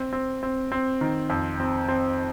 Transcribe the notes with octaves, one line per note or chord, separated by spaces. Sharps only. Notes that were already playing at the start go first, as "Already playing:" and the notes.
Already playing: C4
C4
C4
C4
D#3
F2
C4
C4